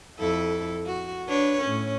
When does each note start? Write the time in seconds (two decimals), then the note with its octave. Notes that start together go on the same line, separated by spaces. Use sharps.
0.19 F2 E4 A4
0.86 F#4
1.28 D4 B4 C#5
1.61 A2 C#4